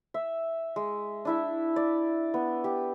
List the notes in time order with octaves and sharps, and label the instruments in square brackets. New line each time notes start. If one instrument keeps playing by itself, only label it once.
[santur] E5
G#3
D4 E4 E5
D5
B3
G4